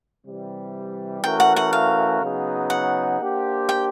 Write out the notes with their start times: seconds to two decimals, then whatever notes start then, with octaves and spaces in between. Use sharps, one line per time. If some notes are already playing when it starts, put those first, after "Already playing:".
0.25 C3 E3 G3
1.23 E3 A3 C#4 F#4 A#4 G5
1.40 F#5
1.56 F#5
1.73 F5
2.21 C#3 F#3 B3 D#4 G#4
2.70 F#5
3.19 A#3 D4 G4 C5
3.69 G5